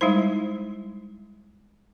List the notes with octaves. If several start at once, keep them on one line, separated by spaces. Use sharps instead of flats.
G3 G#3 D#4 E4 C5